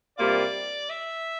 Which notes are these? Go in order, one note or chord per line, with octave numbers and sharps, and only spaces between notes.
C3 G3 A#3 F4 D5
E5